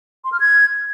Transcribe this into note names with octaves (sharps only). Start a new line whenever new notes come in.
C6
F6
G#6